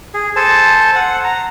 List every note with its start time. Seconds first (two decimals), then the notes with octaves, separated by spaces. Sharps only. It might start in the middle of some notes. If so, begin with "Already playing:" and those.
0.14 G#4
0.36 A4 C5 G#5 A5
0.95 F#5
1.24 A#5